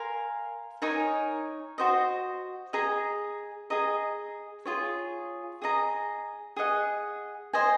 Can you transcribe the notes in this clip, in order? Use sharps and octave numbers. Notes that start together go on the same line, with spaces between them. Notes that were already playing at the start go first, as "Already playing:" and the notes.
Already playing: A#4 F5 G#5 C6
D#4 A#4 C#5 G#5
F#4 C5 D#5
G#4 D#5 A#5
G#4 D#5 A#5
F4 G#4 C#5
G#4 D#5 A#5
G#4 D#5 F#5
C5 D#5 G#5